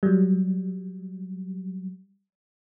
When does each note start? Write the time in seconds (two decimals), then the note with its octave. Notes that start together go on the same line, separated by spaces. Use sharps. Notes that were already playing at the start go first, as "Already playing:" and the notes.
0.03 F#3 G3